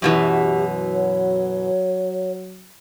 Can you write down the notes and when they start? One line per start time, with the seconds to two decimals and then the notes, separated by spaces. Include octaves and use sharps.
0.02 F#2 B2 E3 F#3 G4
0.94 C#5